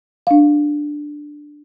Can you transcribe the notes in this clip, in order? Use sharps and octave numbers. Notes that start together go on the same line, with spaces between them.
D4 F5